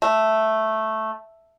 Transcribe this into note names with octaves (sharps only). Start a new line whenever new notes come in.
A3